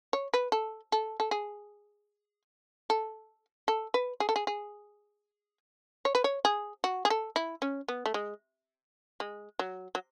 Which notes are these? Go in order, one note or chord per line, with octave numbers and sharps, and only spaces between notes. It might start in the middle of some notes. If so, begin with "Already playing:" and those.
C#5
B4
A4
A4
A4
G#4
A4
A4
B4
G#4
A4
G#4
G#4
C#5
B4
C#5
G#4
F#4
G#4
A4
E4
C#4
B3
A3
G#3
G#3
F#3
F#3